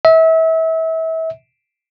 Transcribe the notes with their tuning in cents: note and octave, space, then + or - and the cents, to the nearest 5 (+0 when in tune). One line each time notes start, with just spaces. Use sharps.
E5 -30